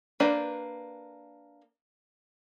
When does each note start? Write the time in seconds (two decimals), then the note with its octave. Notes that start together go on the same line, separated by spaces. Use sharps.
0.20 A#3 D4 B4 C5 D5